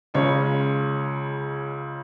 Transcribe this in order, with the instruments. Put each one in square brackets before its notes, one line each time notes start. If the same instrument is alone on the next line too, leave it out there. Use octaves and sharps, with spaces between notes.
[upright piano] C#2 C#3 G#3 C#4 C#5